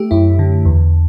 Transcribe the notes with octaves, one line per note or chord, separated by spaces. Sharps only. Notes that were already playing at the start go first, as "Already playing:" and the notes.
Already playing: A3 G4
F#2 E4
D3
E2